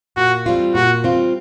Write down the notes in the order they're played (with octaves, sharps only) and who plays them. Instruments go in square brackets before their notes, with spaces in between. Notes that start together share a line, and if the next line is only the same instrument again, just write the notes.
[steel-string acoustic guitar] A#2 [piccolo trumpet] F#4
[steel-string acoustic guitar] G3 C4 F4
[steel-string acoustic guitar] A#2 [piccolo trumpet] F#4
[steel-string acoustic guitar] G3 C4 F4